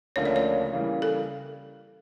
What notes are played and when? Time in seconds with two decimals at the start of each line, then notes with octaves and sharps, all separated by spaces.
0.16 D2 C#3 F3 A#3 D4 C#5
0.25 D5
0.36 C#5
0.73 C#3 E3 G3 A#3
1.02 A4